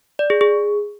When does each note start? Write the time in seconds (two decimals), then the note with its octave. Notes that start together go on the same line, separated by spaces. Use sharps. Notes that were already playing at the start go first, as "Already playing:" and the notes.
0.19 D5
0.30 G#4
0.41 G#4